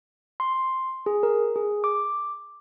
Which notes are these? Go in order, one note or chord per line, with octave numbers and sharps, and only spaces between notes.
C6
G#4
A#4
G#4
D6